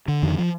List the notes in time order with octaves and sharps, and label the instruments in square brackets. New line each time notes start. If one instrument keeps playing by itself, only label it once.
[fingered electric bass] D3
F2 D#3
F3